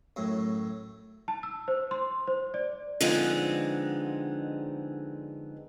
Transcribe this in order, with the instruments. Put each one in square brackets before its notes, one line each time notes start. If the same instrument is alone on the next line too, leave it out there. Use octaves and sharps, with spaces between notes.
[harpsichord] F#2 A2
[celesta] A5
E6
C5
C6
C5
D5
[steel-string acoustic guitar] D3 F3 G#3 B3 C4 D#4